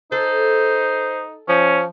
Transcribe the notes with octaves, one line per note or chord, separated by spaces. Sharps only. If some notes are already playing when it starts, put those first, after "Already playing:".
D#4 A4 C5
F3 C#4